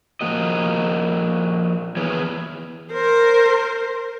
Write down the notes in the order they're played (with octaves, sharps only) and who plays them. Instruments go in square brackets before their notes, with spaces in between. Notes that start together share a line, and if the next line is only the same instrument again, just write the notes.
[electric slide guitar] F3 A#3 F#4 D#5
E3 B3 G#4 C#5
[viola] A#4 C5